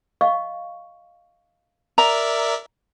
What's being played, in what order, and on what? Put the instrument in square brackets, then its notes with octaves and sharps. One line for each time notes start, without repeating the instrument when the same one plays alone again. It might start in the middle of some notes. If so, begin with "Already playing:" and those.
[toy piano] D#5 F5 C#6
[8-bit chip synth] A#4 D5 E5 [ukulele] A#5